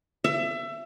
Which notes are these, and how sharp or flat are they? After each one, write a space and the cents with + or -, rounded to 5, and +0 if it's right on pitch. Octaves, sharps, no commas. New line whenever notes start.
E5 +25